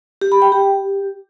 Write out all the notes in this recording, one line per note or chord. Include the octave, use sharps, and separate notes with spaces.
G4
B5
G5
G4